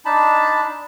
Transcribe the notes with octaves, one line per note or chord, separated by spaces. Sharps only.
D4 D#4 A5 B5